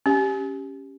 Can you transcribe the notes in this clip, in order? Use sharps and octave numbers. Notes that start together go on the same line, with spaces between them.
C#4 G4